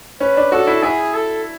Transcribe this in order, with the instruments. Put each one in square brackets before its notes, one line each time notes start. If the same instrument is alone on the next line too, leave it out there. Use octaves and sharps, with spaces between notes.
[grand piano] C#4 [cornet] B4
[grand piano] D4
[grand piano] F#4 [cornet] A4
[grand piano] E4
[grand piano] E4 [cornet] G#4
[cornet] A4